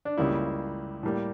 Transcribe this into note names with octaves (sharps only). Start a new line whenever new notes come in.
D4
C#2 C#3 G3 A#3 E4
A2 G3 A#3